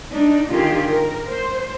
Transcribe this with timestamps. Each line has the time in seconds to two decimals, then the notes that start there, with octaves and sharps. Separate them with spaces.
0.11 D4 D#4
0.51 D3 D#3 F4 G4 G#4
0.89 A#4
1.27 C5